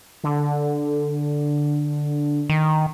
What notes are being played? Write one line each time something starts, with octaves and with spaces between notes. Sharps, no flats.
D3
D#3